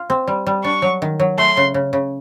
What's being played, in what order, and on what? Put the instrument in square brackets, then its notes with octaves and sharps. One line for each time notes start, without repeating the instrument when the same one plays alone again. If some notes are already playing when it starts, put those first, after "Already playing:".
Already playing: [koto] F4
C4
G3
G3
[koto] D4 [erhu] C#6
[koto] F#3
D#3
F#3
[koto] A3 [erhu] C6
[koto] C#3
C#3
C#3